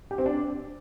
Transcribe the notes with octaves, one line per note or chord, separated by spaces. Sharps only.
G4
C4
D4